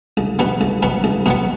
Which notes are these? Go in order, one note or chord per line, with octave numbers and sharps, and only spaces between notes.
C2
B2 F#3 B3
C2
B2 F#3 B3
C2
B2 F#3 B3